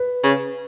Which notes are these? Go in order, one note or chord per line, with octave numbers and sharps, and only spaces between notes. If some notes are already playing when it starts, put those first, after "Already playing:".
Already playing: B4
C#3